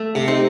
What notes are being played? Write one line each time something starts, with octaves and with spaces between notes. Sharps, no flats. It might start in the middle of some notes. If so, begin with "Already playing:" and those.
Already playing: A3
C3
C4 D#4